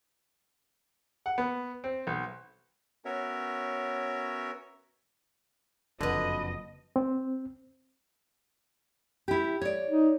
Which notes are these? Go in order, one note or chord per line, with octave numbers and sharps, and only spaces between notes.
F#5
B3
C4
B1
B3 C#4 F#4 A#4 C#5 E5
F#1 F2 D3 F#4 B4 D#5
C4
E4 G4
C#5 D5
D#4